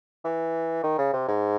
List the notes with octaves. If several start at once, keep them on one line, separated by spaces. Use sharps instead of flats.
E3
D#3
C#3
C3
G#2